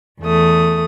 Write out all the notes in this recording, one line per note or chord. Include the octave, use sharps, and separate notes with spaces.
E2 A3 D#6